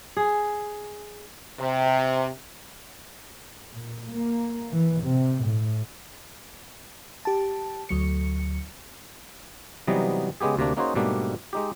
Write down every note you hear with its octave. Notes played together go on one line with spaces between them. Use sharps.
G#4
C3
A#2
A#3
E3
C3
A2
G4 A5
D2 F#3 C#7
C3 E3 F#3 G3 B3 D#4
C#3 G#3 B3 G4 G#4
D2 C3 A#3 D4
A#3 C#4 D#4 F#4 G#4 C5
G#2 B2 G3 A3 A#3 D4
G#3 D#4 G4